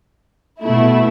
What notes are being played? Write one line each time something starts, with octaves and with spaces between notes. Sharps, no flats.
B2 A3 E4